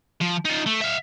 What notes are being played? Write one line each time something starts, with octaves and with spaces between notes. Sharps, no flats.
F3
D#4 F4
A3
E5 F5